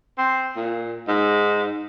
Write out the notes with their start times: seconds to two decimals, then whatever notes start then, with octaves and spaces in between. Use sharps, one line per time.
0.18 C4
0.56 A#2
1.08 G#2